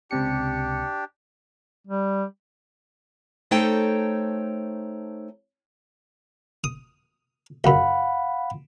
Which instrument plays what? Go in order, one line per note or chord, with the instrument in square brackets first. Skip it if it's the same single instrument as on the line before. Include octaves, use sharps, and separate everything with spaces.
[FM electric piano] C#2 C3 C#7 [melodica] D4 G4
[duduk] G3
[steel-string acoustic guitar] A3 D#4 A4 C5 C#5 G5
[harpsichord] D#6
[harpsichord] C#2 F#2 [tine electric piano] F5 F#5 B5